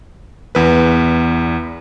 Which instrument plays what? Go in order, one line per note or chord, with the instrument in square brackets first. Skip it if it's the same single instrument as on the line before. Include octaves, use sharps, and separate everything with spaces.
[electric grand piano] E2 B4